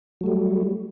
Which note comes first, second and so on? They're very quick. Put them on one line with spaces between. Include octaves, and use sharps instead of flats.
F#3 A3 G3